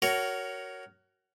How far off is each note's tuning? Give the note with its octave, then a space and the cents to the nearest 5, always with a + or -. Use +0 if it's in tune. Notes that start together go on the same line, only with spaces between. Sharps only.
F#4 +25 A#4 +0 C#5 +10